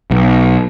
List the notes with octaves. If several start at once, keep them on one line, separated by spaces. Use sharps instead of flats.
B1